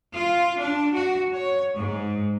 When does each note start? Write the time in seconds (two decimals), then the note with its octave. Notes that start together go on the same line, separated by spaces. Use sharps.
0.14 F4
0.62 D4
0.95 F#4
1.34 C#5
1.75 G#2